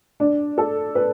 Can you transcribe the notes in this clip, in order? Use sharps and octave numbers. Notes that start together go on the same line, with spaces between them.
D4
A4
B4